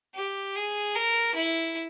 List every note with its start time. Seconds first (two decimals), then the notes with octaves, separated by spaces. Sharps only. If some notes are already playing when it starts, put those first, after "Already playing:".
0.14 G4
0.56 G#4
0.95 A#4
1.35 E4